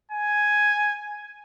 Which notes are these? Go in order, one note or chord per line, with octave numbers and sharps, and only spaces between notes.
G#5